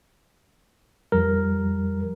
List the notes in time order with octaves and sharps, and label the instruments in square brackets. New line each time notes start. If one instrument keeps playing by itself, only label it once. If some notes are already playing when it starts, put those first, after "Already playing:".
[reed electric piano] F2 F3 G3 [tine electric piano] A#4